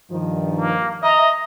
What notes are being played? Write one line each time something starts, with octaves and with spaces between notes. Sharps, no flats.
G2 D#3 F3
A#3
D#5 E5 A#5